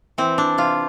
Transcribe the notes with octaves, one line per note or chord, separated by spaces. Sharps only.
E3 C4
D4
C3 F4